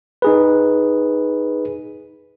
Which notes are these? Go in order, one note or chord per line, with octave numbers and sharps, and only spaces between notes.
D#4 G#4 B4